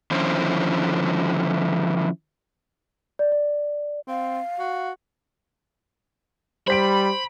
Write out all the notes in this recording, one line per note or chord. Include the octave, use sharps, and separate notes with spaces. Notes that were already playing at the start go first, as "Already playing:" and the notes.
D3 D#3 F3 C#4 E4 C5
D5
D5
C4 F5
F#4
G3 C5 B5 B6 D7